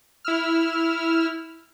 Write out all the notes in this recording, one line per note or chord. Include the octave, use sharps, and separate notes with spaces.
E4 E6 F6